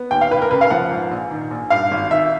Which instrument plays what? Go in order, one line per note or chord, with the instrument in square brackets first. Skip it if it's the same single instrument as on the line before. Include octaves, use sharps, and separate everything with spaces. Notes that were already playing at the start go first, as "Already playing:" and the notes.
Already playing: [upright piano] B3
D#2 G5
F5
F1 B4
A#4
C#3 B4
F5
F3 F#5
G#2
A#1
D#3
A#1
G2 F5
G#1
D#3 E5